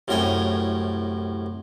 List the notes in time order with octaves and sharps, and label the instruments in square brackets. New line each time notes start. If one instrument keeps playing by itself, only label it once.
[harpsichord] C2 F#2 A2 A#4 G5 G#5